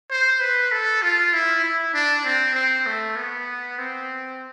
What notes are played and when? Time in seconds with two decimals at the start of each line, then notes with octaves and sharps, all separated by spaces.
0.10 C5
0.40 B4
0.72 A4
1.02 F4
1.33 E4
1.64 E4
1.94 D4
2.25 C4
2.55 C4
2.87 A3
3.16 B3
3.78 C4